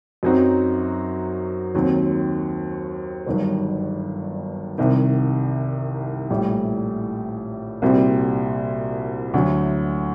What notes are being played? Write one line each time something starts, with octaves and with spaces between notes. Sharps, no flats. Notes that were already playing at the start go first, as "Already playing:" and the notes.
F#2 F#3 C4 D#4 F#4
D#2 D#3 F#3 C4 F#4
G1 G2 D#3 F#3
C2 C3 D#3
A#1 A2 G3
C2 A#2 G3 C4 F#4
D2 D3 F#3